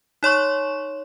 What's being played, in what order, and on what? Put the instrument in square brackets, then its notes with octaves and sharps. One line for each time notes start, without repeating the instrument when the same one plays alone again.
[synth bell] D#4 C#5 C6 C#6